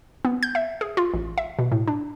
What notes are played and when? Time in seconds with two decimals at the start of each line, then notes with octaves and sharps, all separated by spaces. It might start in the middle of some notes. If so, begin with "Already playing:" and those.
0.25 B3
0.43 G6
0.55 E5
0.81 G#4
0.97 F4
1.14 A1
1.38 E5
1.59 B2
1.72 A2
1.88 D4